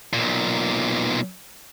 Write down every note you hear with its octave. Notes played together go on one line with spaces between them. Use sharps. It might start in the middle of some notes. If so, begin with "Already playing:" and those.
B1 A#2